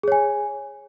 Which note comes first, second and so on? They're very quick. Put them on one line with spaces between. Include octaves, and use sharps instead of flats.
G#4 C#5 G#5